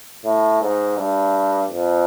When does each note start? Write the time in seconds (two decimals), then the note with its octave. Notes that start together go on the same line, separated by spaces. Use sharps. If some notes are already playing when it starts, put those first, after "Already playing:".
0.25 A2
0.61 G#2
0.97 G2
1.70 F2